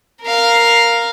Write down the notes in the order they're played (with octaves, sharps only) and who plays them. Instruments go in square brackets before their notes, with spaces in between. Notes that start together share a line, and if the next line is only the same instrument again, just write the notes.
[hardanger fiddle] A#4 F5